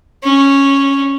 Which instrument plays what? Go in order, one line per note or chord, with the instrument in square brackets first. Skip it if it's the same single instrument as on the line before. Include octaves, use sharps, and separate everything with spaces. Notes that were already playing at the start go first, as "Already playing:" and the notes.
[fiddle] C#4